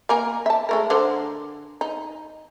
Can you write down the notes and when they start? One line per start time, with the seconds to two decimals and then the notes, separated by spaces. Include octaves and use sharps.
0.09 A#3 A#4 G#5
0.46 E5 A5
0.69 G#3 A3 A#4
0.90 D3 A#4 C5
1.81 D#4